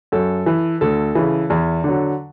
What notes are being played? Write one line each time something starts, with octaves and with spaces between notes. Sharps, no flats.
F#2 A4
E3
D2 A4
C#3 E3
E2
D3 F#3